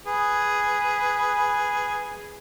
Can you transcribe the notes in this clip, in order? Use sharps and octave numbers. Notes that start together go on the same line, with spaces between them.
G#4 B4